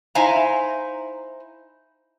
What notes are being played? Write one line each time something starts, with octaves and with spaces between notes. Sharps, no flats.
D#4 E4 C5 F5 G#5 A#5